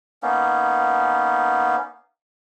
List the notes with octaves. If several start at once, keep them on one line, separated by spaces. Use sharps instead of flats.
A#3 B3 C#4 D#4